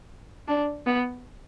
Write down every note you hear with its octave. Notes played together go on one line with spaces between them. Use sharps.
D4
B3